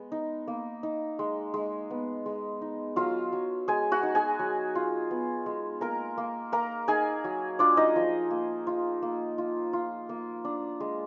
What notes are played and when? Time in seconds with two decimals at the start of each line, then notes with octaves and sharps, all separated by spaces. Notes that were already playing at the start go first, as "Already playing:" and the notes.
Already playing: G#3 B3
0.12 D#4
0.48 A#3
0.83 D#4
1.19 G#3
1.54 G#3
1.90 B3
2.26 G#3
2.61 D#4
2.96 F#3 F4 F5
3.33 F#3
3.68 G#3 G#4 G#5
3.92 F#4 F#5
4.03 D#4
4.15 G#4 G#5
4.39 F#3
4.75 F4
5.11 B3
5.46 G#3
5.81 A#3 A#4 A#5
6.17 A#3
6.52 A#3 A#4 A#5
6.88 D#4 G#4 G#5
7.24 F#3
7.59 D4 F4 D5
7.77 D#4 D#5
7.96 F3
8.30 A#3
8.67 F4
9.02 A#3
9.38 F4
9.73 F4
10.09 A#3
10.45 D4
10.80 G#3